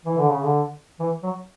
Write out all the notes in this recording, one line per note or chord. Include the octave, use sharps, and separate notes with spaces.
E3
D3
C#3
D3
E3
F#3